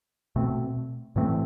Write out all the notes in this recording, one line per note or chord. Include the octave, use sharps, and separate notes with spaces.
B2 A3 C4
A2 E3 A3 C4